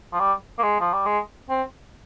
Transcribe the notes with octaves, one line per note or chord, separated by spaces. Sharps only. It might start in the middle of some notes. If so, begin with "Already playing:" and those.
F3
G3
A#3
G#3
F3
G3
G#3
C4